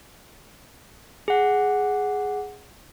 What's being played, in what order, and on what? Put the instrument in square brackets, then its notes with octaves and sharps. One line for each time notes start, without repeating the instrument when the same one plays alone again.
[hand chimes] G#4 F#5